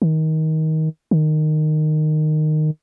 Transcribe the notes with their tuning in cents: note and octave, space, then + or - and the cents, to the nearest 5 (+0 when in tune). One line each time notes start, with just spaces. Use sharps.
D#3 +20
D#3 -15